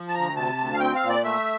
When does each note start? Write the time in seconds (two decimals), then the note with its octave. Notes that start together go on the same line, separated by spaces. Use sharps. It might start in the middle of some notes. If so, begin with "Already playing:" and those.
Already playing: F3
0.08 A5
0.15 D2 A#5
0.36 C3 A5
0.58 D2
0.73 F5
0.80 C4 G5
0.95 F5
1.03 A#2
1.09 D5
1.24 A3 E5